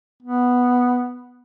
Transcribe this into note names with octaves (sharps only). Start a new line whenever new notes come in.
B3